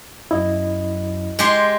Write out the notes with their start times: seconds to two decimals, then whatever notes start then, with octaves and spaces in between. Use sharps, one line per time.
0.31 F#2 E4 D#5
1.39 G#3 G4 C6